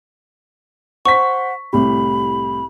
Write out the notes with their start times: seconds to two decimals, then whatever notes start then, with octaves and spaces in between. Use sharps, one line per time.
1.05 C5 F#5 C#6 B6
1.73 C2 A2 G4 B5